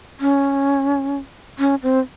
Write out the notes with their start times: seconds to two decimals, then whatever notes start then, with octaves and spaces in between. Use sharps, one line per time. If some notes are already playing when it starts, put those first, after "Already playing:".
0.20 C#4
1.59 C#4
1.83 C4